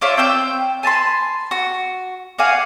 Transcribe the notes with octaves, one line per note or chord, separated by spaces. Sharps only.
D4 F4 C#5 E5
C4 G5 E6 G6
G#5 A5 B5 C6
F#4
F#4 D5 F5 G#5